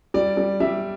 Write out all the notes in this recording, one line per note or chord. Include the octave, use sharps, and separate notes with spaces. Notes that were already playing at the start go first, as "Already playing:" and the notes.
G3 D5
G3
G3 E5